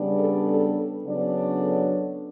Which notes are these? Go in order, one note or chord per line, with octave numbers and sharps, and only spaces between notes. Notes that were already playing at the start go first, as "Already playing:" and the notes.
Already playing: C#3 G3 B3 D4
A4
A4
C#3 F#3 B3 D4
A4